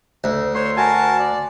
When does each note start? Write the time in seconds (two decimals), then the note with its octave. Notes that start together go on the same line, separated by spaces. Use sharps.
0.24 D2
0.55 C5 C#5 C6
0.77 F#4 A#4 G#5 A5
1.19 D5